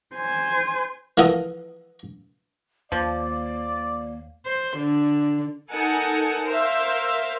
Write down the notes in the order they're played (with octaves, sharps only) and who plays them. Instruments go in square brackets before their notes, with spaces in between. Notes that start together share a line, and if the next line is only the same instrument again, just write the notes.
[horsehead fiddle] C5 G#5
[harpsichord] E3 F3 A4 A#4 F#5 D#6
[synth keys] D#2 [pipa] F3 [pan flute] A#3 [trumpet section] D5
[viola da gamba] C5
D3
[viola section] D#4 A4 A#4 F#5 G#5 A5
A#4 C5 E5 F5